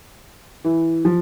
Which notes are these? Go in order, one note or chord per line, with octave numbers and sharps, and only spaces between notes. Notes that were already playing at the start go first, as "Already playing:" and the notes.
E3
F3